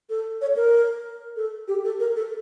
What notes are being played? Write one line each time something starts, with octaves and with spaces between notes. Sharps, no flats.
A4
C#5
A#4
A4
G4
A4
A#4
A4